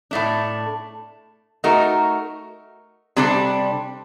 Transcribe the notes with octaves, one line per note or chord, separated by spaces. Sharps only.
A2 A3 D4
A3 D#4 F#4 A#4
C3 G3 D4 A4 D5